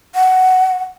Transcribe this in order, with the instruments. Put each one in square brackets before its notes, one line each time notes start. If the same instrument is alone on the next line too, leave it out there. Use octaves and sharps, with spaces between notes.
[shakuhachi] F#5